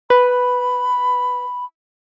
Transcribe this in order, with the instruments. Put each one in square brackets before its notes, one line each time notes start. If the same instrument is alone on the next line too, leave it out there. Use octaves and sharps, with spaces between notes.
[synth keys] B4 [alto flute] B5